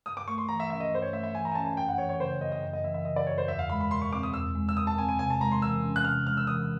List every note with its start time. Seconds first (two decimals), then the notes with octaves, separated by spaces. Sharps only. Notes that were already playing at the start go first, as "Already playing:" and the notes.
0.06 G2 D#6
0.17 D6
0.28 A3 C#6
0.38 C6
0.48 E3 A#5
0.60 E5
0.70 C#4 E5
0.80 D#5
0.92 G2 C5
1.02 C#5
1.13 A3 E5
1.23 E5
1.34 E3 G#5
1.45 A#5
1.51 G#5
1.55 C#4 A5
1.66 G#5
1.77 F#2 G5
1.88 F#5
1.98 E3 C#5
2.09 C#5
2.19 C#3 C5
2.31 C#5
2.41 F#2 D#5
2.52 D#5
2.62 F#2
2.73 D#5
2.84 E3 E5
2.94 E5
3.05 C#3 D#5
3.16 D5
3.27 F#2 C#5
3.38 C5
3.48 E2 E5
3.59 F5
3.69 G#3 B5
3.81 B5
3.90 B2 C6
4.02 C#6
4.12 C4 D6
4.23 D#6
4.34 E2 E6
4.55 G#3
4.69 E6
4.76 B2 D#6
4.87 A5
4.98 C4 G#5
5.09 G#5
5.19 C3 G#5
5.30 A5
5.41 G#3 A#5
5.52 C6
5.62 E3 E6
5.83 C#4
5.96 F#6
6.05 C3 F6
6.26 G#3 F6
6.37 E6
6.47 E3 D#6